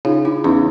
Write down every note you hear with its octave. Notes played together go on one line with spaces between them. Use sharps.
C#3 D#4 F4
D4 E4
E2 C#4 D#4